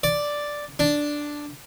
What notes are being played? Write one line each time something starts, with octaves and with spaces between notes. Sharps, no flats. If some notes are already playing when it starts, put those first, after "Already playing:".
D5
D4